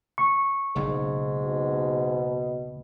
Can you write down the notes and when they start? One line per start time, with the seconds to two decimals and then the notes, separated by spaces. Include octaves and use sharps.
0.18 C#6
0.76 F#1 B1 G#2 C#3
1.42 B2